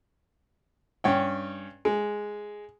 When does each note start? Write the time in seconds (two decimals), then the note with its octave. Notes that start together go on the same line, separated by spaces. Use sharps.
1.04 G2 C#4 G5
1.85 G#3